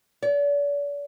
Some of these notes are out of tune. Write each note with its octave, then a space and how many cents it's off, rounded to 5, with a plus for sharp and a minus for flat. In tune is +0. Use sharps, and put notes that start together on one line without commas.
D5 -40